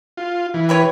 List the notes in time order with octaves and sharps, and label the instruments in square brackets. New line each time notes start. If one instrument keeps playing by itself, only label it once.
[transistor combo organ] F4
E3
[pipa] G4 B4 C#5